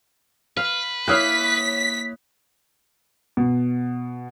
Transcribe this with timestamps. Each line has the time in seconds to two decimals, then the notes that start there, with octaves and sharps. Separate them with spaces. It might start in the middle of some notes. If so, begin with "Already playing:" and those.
0.57 B4 F5
1.08 A#3 E4 C#5 F5 D#6 F#6 B6
3.37 B2